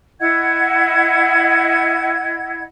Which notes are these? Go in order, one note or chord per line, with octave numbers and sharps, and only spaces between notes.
E4 D#5 F#5 G#6